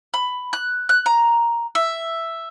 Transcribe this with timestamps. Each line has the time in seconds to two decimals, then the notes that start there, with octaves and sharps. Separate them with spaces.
0.14 B5
0.53 F#6
0.89 F#6
1.06 A#5
1.75 E5